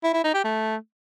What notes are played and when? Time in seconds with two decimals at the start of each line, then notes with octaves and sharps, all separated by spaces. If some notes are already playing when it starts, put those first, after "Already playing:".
0.03 E4
0.14 E4
0.24 D#4
0.34 G4
0.44 A3